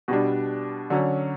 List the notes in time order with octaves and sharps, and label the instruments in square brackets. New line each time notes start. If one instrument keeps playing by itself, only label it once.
[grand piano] B2 G3 D4
D3 F#3 C#4